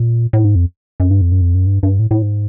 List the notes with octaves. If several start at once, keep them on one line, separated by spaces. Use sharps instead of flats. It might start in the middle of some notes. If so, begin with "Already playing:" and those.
Already playing: A#2
A2
G#2
F2
F#2
G2
F2
F#2
F2
F#2
G2
G2
A2
A2
G#2